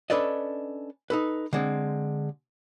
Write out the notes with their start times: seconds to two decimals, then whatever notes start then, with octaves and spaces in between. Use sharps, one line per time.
0.10 C#4 D4 A4 B4 D5 D#5
1.10 D#4 A4 B4
1.53 D3 G#3 C4